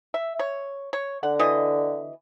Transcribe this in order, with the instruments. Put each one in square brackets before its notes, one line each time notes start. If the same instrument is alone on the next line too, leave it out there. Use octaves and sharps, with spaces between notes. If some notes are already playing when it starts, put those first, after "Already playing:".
[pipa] E5
C#5
C#5
[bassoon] D3 [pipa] F#5
[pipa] B2 E3 D#5